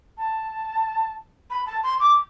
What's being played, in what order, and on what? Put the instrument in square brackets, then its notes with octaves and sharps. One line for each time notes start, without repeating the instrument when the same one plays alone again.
[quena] A5
B5
A5
C6
D6